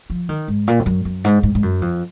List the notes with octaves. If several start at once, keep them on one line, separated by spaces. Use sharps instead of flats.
F3
D#3
G#2
A#2
F2
F#2
F#2
G#2
G#2
G#2
F#2
F2